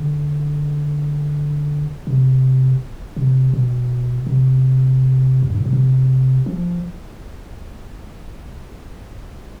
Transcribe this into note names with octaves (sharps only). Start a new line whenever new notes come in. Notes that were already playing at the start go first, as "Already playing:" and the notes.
Already playing: D3
C3
C3
B2
C3
F2
G2
A2
B2
C3
F3